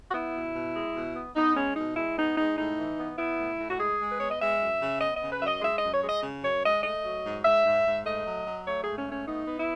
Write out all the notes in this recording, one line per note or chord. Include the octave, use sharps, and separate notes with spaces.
F#4
B3 E4
B2
B2
G#3
B2
B3
B3 D#4
G#3 C#4
B2 D#4
G#3 E4
B3 D#4
G#3 D#4
A2 D#4
E3
B3
B3 E4
A2
A2
F#4
G#3 G#4
G#3
B4
B3 C#5
D#5
G#3 E5
F#2
C#3
B3 D#5
D#5
C#3
B4
F#2 E5
D#5
G#3 E5
D#5
F#2
C#5
G#3 D#5
C#3
F#2 C#5
G#3 D#5
A3 D#5
F#3
G#2
G#2 E5
G#2
G#2
A3 D#5
F#3
F#3
A3 C#5
G#2 G#4
C#4
A3 C#4
B3 D#4
B3
E4